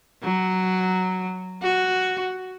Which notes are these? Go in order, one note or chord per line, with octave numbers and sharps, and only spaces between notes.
F#3
F#4